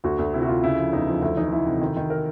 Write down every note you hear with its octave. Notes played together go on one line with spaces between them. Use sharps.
D2 F#4
D2
C3 E4
F#4
D2 F4
C#3 E4
F3
E2 D#4
F3
D2 E4
E3 D#4
E3 E4
C3
D#3
D#3
A#4